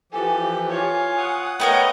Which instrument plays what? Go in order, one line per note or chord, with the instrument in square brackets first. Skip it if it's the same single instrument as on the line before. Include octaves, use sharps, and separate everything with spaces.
[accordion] E3 F3 G4 [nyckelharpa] A4 [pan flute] G#5
[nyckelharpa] F4 C#5
[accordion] F#5 D#6
[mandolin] A3 B3 A#4 [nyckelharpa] C#5 D#5 [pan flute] G5